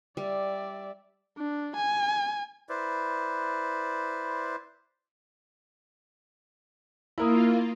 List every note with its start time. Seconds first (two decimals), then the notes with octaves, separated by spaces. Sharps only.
0.17 G3 D5 E5
1.38 D4
1.76 G#5
2.69 E4 B4 C5 D5
7.18 A#3 E4 F4 A#4 D#6